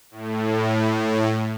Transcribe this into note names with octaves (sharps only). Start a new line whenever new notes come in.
A2